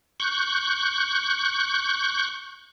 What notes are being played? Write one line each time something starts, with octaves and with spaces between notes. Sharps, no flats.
C#6 F#6 G6